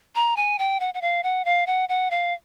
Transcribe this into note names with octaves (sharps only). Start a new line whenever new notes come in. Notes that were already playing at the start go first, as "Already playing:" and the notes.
A#5
G#5
G5
F#5
F#5
F5
F#5
F5
F#5
F#5
F5